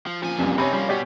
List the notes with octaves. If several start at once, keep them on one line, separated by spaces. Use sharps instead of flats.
F3
A#2 F3 G#5
F1 C2 F#2
C3 C4 D#4 C#5 G#5 B5
F3 G3 A#3
B2 B3 C#4 G4 D5